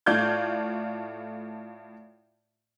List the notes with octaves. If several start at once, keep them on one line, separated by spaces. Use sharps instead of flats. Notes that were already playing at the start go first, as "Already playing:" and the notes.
A2 A3 F4 D5 G6 G#6